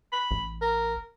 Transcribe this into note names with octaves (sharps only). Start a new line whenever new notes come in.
B5
A1
A#4